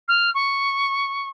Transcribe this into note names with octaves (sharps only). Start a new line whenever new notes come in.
F6
C#6